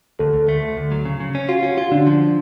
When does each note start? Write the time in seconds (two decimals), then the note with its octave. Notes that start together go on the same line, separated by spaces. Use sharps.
0.19 D2 A4
0.33 D2
0.49 A3
0.62 D2
0.77 D2
0.92 F#3
1.05 C#3
1.20 C#3
1.35 C#4
1.49 F4 F#4
1.63 C#4 F#4
1.77 F4 F#4
1.91 D3 D4
2.07 F3